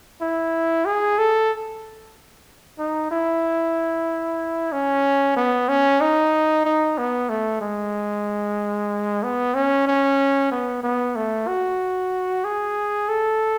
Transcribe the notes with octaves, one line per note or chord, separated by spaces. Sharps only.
E4
G#4
A4
D#4
E4
C#4
B3
C#4
D#4
D#4
B3
A3
G#3
B3
C#4
C#4
B3
B3
A3
F#4
G#4
A4